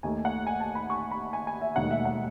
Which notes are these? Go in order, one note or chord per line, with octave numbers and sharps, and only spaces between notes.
D#2 D#3 A3 G#5
F#5
G#5
A5
B5
C#6
B5
G#5
G#5
E5
E1 D#2 D#3 A3 F#5
E5
F#5